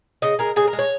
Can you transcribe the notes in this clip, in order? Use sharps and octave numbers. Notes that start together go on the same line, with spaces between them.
C#3 D#5
G#3 A#4
C#3 G#4
A#4
G#3
C#5